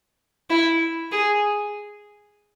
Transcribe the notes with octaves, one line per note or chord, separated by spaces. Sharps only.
E4
G#4